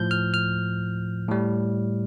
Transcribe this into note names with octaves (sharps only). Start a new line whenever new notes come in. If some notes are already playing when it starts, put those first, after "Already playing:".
Already playing: A2 F3 G6
F6
F6
A2 G3